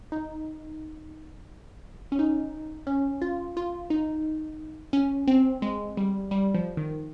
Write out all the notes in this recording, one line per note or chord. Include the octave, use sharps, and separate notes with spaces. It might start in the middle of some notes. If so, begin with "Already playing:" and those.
D#4
C#4
D#4
C#4
F4
F4
D#4
C#4
C4
G#3
G3
G3
F3
D#3